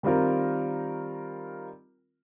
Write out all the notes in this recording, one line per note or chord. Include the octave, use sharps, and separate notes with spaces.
D#3 G3 C4 F4 A#4